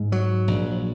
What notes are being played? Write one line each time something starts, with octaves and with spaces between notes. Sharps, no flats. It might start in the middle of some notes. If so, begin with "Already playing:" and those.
Already playing: G#2
F#3
A#1